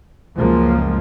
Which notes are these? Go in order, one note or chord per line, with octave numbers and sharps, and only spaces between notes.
C#2 F#2 F3 G#3 A#3